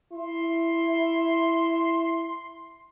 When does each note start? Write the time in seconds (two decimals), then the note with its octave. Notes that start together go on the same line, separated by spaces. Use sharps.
0.13 E4 C6